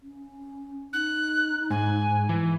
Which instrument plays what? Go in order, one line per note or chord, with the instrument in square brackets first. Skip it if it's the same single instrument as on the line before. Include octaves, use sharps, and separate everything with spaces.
[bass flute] C#4
[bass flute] D#4 [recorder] F#6
[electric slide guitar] G#2 [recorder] G#5
[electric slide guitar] E3